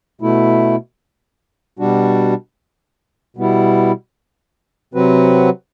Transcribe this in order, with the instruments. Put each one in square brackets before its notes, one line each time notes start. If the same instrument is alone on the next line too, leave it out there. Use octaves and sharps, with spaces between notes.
[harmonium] B2 A3 E4
B2 G3 D4 F#4
B2 G3 B3 E4
C3 F#3 C4 F#4 B4